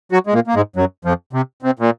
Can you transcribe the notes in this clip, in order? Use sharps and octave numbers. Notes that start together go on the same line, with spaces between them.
F#3 F#4
G#3
A#2 A#3
A#3
G#2 G#3
F#2 F#3
F2 F3
C3
C3
A#2